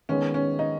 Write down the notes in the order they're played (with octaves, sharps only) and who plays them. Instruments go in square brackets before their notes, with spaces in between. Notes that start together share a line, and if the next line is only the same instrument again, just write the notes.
[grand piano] D#3 G#3 B3 [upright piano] C#4
[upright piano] C#4
D#4